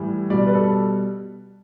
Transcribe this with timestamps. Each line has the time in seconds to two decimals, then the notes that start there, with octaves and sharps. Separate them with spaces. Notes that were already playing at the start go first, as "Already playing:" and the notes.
Already playing: A2 E3 G3
0.30 B2 G3 D5
0.47 B4
0.55 A4